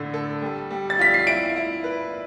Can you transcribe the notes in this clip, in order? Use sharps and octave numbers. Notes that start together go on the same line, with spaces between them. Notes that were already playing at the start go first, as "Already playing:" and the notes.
Already playing: A2 D3 A4
A4
G3
G3
A6
F4 B6
C7
E4 D7
E4
B4